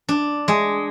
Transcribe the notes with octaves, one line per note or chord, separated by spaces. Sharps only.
D4
G#3